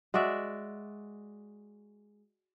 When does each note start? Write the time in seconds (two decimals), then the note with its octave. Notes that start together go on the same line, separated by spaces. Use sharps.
0.14 G#3 F#4 D5 E5